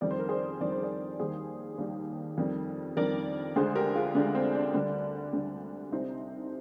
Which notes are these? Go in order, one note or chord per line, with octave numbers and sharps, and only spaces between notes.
F2 D#3 G3 D5
C5
A#4
G#4 C5
F2 D#3 G3 D5
C5
A#4 D5
D#2 D#3 G3 G#4 C5
D#2 D#3 G3
F2 D#3 G3
F2 D#3 G3 A#4 D5
D2 D3 G#3 G#4 C5
G4 A#4
F4 G#4
D2 D3 G#3 D4
C4
D4
D2 D3 G3
D2 D3 G3
C2 C3 G3 C4 D#4